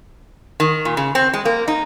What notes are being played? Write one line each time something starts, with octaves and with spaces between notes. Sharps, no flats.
D#3
A#2
C#3
C4
G#3
A#3
D#4